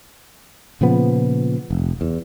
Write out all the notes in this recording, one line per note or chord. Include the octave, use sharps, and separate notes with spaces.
A#2 C#3 F3 B3
F1
E2